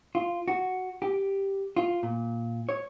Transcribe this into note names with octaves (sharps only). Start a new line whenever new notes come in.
F4
F#4
G4
F4
A#2
C#5